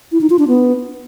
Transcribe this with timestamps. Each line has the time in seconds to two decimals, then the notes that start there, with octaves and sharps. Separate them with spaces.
0.12 E4
0.21 D#4
0.30 F4
0.39 D4
0.48 B3